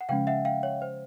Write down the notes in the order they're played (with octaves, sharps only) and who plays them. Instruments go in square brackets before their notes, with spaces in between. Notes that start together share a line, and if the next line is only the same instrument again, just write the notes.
[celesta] F#5
[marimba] C#3 F3 G#3 C#4 [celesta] F5 G5
[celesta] E5 F#5
F5 G5
C#5
C5